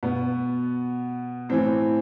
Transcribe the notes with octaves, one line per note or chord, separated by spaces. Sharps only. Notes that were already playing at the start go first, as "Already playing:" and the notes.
B2 B3
A2 E3 C4